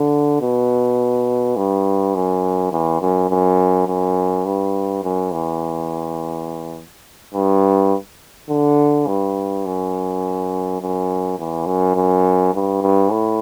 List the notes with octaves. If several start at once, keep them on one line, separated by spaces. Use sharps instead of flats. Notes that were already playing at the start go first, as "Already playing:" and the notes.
Already playing: D3
B2
G2
F#2
E2
F#2
F#2
F#2
G2
F#2
E2
G2
D3
G2
F#2
F#2
E2
F#2
F#2
G2
G2
A2